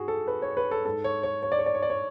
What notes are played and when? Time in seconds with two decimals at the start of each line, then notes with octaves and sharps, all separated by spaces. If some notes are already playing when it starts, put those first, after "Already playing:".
Already playing: G#2 F#4 G#4
0.08 A4
0.27 B4
0.42 C#5
0.57 B4
0.71 A4
0.85 G#2 A4
1.04 C#5
1.23 C#5
1.43 C#5
1.52 D5
1.59 C#5
1.66 D5
1.75 C#5
1.83 D5
1.90 C#5